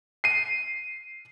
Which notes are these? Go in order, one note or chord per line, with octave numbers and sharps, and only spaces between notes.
C7 D#7